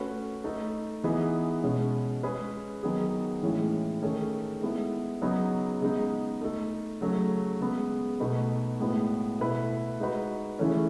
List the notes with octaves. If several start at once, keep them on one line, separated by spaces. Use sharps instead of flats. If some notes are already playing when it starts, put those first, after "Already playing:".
Already playing: A3 C#4 F#4 B4
A3 D#4 A4
E3 B3 D#4 G#4 B4
B2 G#3 C#4
G#3 C#4 G#4 B4
D#3 F#3 B3 D#4 G#4
A2 E3 G#3 C#4
D#3 A3 C#4 G#4
G#3 B3 E4 A4
C#3 F#3 B3 D#4 G#4
C#3 G#3 B3 D#4
A3 D#4 A4
C#3 F#3 A3
C#3 G#3 B3
B2 A3 D#4 F#4 B4
A2 G#3 B3 F#4 B4
B2 A3 E4 B4
G#3 D#4 F#4 B4
C#3 E3 A3 C#4